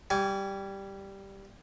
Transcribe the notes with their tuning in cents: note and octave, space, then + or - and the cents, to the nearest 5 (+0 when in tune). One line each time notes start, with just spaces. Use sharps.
G3 +0 G#5 +0 D6 -45